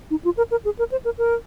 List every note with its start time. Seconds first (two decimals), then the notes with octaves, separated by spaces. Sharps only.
0.11 D#4
0.25 F4
0.37 A#4
0.51 A#4
0.65 G#4
0.79 A#4
0.92 C5
1.05 A#4
1.18 A#4